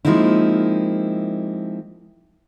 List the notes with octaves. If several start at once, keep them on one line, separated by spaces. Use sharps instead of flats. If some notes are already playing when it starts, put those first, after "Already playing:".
F3 G#3 A#3 C4 D#4 E4